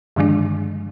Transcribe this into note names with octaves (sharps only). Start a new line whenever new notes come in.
G2 D3 D#3 F3 G#3 D4